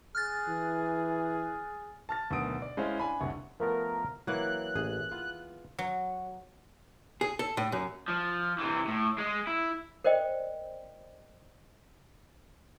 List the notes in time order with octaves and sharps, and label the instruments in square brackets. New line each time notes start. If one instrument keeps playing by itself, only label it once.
[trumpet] G#4 [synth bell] F6 F#6 A6
[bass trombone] E3
[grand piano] A5 F6 A6
D2 B2 D#3 F#3 D#6 D7
D5
G#3 C#4 E4 C5 F5
D4 G#5 B5
F#1 C2 D3 F#5 C#6
[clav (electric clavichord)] F3 A3 B3 [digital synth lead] A#4
[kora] E3 A#3 [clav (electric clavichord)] F#3 [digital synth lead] F#6
[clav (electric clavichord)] A1 [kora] G#4
[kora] B3 [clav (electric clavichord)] F4
[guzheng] F#3
[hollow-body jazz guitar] G#4
A4
A2
F#2
[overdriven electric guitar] F3
C3 E3
A2
G#3
E4
[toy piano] A#4 C5 D5 D#5 G5